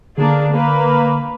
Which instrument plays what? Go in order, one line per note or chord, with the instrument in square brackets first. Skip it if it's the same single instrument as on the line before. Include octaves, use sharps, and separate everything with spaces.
[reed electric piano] D3 [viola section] A#3 D4 G#4
[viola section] A#3 B4